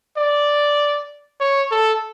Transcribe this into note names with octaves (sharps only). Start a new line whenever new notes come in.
D5
C#5
A4